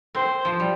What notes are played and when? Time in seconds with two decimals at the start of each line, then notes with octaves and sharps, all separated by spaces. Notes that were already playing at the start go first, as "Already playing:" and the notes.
0.15 C4 C5
0.45 F3
0.60 G3